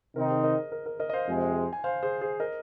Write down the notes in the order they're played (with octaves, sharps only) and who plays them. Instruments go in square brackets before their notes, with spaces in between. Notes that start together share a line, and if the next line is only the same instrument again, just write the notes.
[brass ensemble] C3 D#3 C4 D#4 [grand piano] A#4
[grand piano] G#4 C5
A#4 D#5
A#4
A#4
A#4 D#5
D#5
C5 F5
[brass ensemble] F2 C3 G#3
[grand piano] G#5
C5 F5
G#4 C5
G#4 C5
A#4 D#5